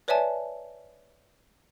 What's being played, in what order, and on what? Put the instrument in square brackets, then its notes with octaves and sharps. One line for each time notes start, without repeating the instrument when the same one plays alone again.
[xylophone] B4 C#5 D5 E5 G#5 A5